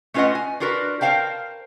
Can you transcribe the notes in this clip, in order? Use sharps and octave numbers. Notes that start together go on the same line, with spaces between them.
A3 C#4 F4 B4 D#5 F#5
G#5
D4 F4 F#4 A#4 B4
A#4 C5 C#5 F5 G5 A5